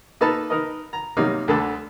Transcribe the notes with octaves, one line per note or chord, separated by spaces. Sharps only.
A#3 D#4 A4 B4 A5
D#4 A#4 B4 D#5
A#5
C3 F#3 G3 A#3 D#4
D2 D3 A4 A5 B5